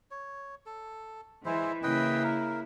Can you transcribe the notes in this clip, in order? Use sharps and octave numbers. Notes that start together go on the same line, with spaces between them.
C#5
A4
E3 G#3 E4 C5
C#3 A#3 E4 B4 D#5 G5
A#4